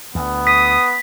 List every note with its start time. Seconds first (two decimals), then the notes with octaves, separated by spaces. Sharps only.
0.15 D2 B3
0.47 D#6 B6